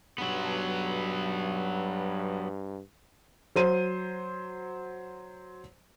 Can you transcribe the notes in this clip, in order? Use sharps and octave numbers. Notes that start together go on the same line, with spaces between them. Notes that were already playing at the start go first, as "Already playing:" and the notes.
G2 F#3 B3
F#3 C5 D#7